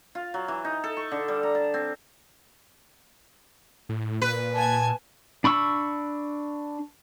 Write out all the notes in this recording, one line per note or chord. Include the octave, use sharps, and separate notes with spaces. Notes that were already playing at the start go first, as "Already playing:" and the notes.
F4
F#3
E3
D#4
A4
C#6
D3
G3
A#5
A5
C4
A2
A#2 B4
G#5 A5 G#6
D4 B5 C#6 E6